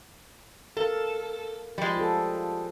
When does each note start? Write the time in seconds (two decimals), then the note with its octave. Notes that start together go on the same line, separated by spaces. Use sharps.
0.77 A4 A#4 F5
1.78 F3 G3 G#3
1.96 F4 G#4 A4